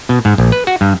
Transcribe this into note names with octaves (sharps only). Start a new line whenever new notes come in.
B2
G#2
A#1
B4
F#4
G2